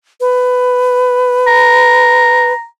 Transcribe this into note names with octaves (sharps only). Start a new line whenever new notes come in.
B4
A#5